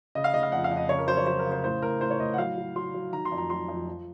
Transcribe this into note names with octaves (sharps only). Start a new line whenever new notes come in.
C#3 D#5
F5
C#3 D#5
F5
F2 F#5
F5
F2
D#5
C#3 C#5
A#4
F#3 C5
C#5
F#3 C5
A#4
C#3
C5
A2 C5
A2 A#4
A2 C5
C#5
A2 D#5
F#5
F#3 F5
F#3
F#3 C6
F#3
D#3 A#5
C6
F2
A#5
F#3 C6
F2
F3